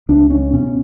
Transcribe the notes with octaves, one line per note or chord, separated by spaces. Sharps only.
C#2 D4
C#4
B2 C#4